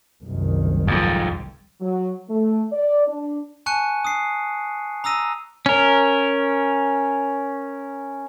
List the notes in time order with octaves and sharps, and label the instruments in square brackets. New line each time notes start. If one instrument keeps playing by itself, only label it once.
[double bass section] F#1 C2 D#3
[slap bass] F2 G#2
[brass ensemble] F#3
A3
D5
D4
[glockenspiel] G#5 A5 C#6 F#6 C#7 D#7
D#6 C7
A#5 D#6 E6 A#6 D#7
[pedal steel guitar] C#4 A#4